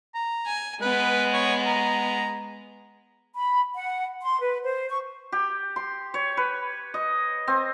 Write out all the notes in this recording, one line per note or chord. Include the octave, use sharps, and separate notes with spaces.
A#5
G#5
G#3 B3 B4
C#5
A#5
B5
F#5
C6
B4
C5
C#6
G4
C6
C#5
B4
D#5
C4